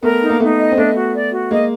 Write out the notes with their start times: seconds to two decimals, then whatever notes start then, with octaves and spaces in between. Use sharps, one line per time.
0.03 A3 B3 A#4
0.22 D#4
0.29 A#3
0.40 A3 B3 D#4
0.58 D#5
0.71 C4
0.77 A3 B3 D4
0.95 F#4
1.14 D5
1.32 F#4
1.50 G#3 A#3 D#5